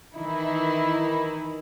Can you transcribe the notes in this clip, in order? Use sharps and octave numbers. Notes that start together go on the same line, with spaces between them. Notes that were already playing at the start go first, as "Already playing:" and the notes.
D#3 E3 D#4 E4